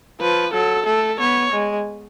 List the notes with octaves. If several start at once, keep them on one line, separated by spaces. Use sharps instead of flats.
F3 B4
F#3 A4
A3 A4
B3 C#5
G#3